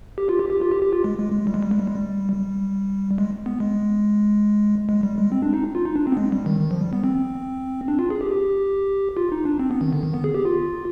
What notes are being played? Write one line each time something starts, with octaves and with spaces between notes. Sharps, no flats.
G4
F4
G4
G4
F4
G4
G4
F4
G#3
G#3
G#3
G3
G#3
G3
G#3
G3
G#3
G3
G3
G#3
B3
G#3
G#3
G3
G#3
C4
D4
D#4
F4
D#4
D4
C4
B3
G#3
G3
D#3
D#3
F3
G3
B3
C4
D4
F4
G#4
G4
G4
F4
D#4
D4
C4
B3
D#3
D3
D#3
B3
G#4
G4
F4